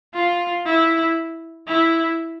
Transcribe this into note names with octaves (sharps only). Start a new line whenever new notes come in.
F4
E4
E4